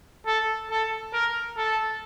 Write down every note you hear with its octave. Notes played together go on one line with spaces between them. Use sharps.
A4
A4
A#4
A4